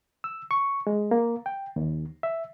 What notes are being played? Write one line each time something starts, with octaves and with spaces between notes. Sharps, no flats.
E6
C#6
G#3
A#3
G5
D#2
E5